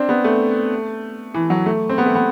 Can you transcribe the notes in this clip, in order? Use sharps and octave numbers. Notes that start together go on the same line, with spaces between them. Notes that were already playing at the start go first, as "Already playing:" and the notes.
Already playing: C4 D4
B3
A3
E3
F#3
A3
C4
B3
A3
B3